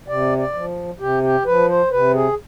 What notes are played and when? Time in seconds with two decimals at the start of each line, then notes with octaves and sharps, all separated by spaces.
0.08 C3 D5
0.38 D5
0.54 F3
1.00 C3 G4
1.23 G4
1.45 F3 B4
1.69 C5
1.91 C3 B4
2.14 G#4